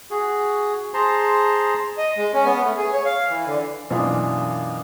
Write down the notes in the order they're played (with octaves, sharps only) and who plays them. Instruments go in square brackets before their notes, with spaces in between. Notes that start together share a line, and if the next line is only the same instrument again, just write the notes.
[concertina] F#4 G#4
G#4 C5 A5 A#5 C6
[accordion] D#5
G#3
C#4
B3
A3
G#4
C#5
F5
E3
D3
[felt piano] F#2 B2 E3 A#3 D4 F4